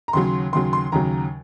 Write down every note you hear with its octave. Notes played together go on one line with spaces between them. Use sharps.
A#5
D#2 C#3 F#3 C6
D#2 C#3 F#3 C6
C6
D#2 C#3 F#3 A#5